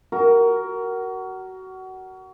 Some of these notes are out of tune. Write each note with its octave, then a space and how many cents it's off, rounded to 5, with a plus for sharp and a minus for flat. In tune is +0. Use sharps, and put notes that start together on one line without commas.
F#4 +25 A#4 +0